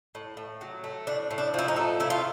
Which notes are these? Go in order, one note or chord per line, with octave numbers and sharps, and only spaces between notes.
A2
A2
F#3
A3
A2 D4
A2
D4
F3 E4
D#4
A3
A2 E4
F4